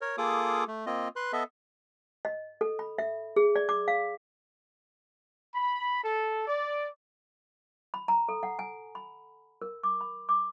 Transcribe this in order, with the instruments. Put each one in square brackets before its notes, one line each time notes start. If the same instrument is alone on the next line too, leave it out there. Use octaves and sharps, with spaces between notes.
[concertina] A#4 C#5
A#3 F4 G#4 A4 D6 D#6
A3
A#3 C4 F4 D#5
B4 C6 F#6
B3 A4 D#5 E5
[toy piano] D#5
A4
B5
E5
G#4
D5
D6
F5
[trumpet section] B5
A4
D5
[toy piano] B5
A#5
A4
F#5
G#5
B5
A#4
D6
B5
D6